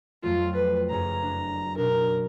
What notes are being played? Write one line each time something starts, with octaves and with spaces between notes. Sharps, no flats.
F2 F#3 A3 F4
B4
F#1 F#2 G#4 A#5
D4
B2 D4 D#4 A#4